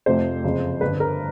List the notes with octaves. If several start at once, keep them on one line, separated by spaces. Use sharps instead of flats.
F1 F2 C3 F3 A3 C5
F#1 F2 C#3 F3
G1 G2 D3 B4
A#4